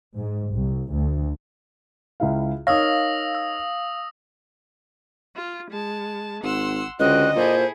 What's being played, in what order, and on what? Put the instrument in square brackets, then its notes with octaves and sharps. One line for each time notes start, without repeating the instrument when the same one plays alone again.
[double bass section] G#2
C2
D2
[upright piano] C#2 E4 F5
[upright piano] D#4 A#4 C#5 [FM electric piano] F5 [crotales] D#6 E6 A#6
[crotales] E6
[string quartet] F4
G#3 A5
[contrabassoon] G#1 [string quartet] F#5 C6 E6
[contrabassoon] C#2 [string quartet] D3 C4 F#4 [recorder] D#5 [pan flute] F#6
[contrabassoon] A#2 [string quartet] E4 G#4 A4 [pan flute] C5